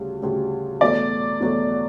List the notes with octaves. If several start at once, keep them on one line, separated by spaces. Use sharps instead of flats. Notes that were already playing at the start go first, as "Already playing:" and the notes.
Already playing: D2 C#3 G3
D2 C#3 G3
E2 B2 F#3 A3 D5
E2 B2 F#3 A3